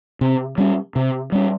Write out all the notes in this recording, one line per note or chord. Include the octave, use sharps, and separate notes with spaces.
C3
G3 C#4
C3
G3 C#4